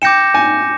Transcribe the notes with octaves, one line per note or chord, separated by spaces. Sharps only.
G5 D6 G6 A#6 C#7 E7
G#5